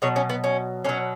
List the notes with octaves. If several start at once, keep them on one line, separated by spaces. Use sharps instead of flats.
B2 F#3 C#5
C#4
B3
C#4
B2 F#3 C#4